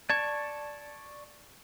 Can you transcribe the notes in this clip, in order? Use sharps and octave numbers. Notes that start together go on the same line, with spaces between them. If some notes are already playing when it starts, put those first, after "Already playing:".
D5 A5 C#6 G#6